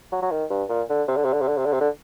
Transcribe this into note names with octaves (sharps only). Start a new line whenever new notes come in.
F#3
F#3
D#3
G2
A#2
D3
C3
D3
C3
D3
C3
D3
C3
D3
C3
D3